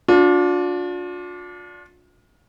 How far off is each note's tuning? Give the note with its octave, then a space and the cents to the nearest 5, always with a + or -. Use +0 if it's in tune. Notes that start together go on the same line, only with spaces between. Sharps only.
D4 -15 F4 +40